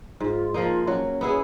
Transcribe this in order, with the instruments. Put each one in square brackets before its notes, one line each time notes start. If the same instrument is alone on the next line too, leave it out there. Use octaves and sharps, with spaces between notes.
[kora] G#2 [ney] F4
[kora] F3 A#3 D#4 [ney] F4
[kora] F#3 [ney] C#4
[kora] B3 E4 G#4